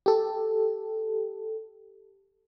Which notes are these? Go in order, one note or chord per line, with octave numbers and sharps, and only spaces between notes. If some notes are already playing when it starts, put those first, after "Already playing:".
G4 A4